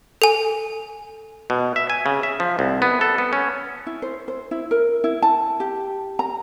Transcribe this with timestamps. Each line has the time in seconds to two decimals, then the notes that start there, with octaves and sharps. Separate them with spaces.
0.22 A4 G#5
1.50 B2
1.76 E5
1.90 G#5
2.06 C#3
2.23 E5
2.40 F3
2.59 C2
2.82 B3
3.01 A4
3.18 B3
3.33 C#4
3.87 E4
4.02 C5
4.28 C5
4.51 E4
4.71 A#4
5.04 E4
5.22 A5
5.60 G4
6.19 A#5